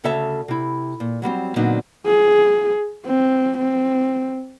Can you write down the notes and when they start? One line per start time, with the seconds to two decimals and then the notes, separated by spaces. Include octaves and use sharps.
0.04 D2 C#3 A4 C#5 E5 A5
0.48 C3 E4
1.00 A#2
1.22 F#3 G3 A#3 C4
1.56 A#2 D3 F#3 B3 C4 D#4
2.06 G#4
3.07 C4
3.58 C4